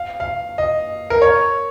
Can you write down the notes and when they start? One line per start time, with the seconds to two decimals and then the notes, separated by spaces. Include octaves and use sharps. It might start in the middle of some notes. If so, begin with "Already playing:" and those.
Already playing: F5
0.20 F5
0.58 D#5
1.10 A#4
1.22 C#5